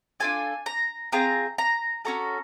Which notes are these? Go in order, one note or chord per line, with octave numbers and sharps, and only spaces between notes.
D4 F4 A4 G#5
A#5
C4 F4 G#4 A#5
A#5
C#4 F#4 A4 A#5